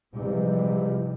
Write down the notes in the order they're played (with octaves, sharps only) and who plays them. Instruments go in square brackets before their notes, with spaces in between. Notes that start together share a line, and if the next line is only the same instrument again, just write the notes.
[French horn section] G#2 E3 G3 [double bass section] C3 F3